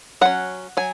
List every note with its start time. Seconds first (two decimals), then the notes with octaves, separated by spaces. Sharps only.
0.21 F#3 C#4 F#5
0.77 F#3 G#5